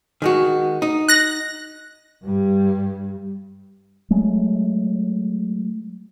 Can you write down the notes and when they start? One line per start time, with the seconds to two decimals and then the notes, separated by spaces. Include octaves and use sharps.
0.22 D#3 G#3 F#4
0.82 D#4
1.08 F#6 A#6
2.24 G2 G3
4.10 F#3 G#3 A3